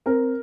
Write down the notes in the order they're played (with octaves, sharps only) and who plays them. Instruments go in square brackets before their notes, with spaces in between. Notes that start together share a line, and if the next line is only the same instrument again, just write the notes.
[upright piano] C4 A#4